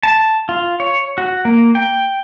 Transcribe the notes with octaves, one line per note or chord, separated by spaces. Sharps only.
A5
F4
C#5
F#4
A#3
G5